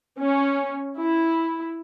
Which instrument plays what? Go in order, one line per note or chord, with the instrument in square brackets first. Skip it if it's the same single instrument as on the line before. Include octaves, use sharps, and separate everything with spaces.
[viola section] C#4
E4